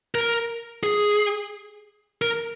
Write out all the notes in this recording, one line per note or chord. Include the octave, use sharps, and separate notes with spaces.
A#4
G#4
A#4